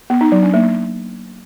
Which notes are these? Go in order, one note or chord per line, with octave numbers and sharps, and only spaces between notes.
B3
D#4
F#3
D4
A#3